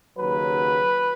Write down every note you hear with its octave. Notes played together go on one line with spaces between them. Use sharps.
D#2 C#3 F#3 B4